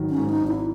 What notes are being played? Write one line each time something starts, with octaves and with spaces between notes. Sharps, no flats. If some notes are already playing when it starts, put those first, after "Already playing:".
Already playing: G#1 D#3 F#3
C#4
G#2
D#4
G#1
E4